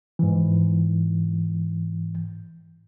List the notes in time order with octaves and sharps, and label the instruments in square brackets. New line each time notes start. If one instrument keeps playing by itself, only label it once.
[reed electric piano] G#2 E3